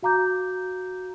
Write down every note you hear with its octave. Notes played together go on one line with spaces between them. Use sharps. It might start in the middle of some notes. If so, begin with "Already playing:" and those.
F#4 F5 A#5 D6 G6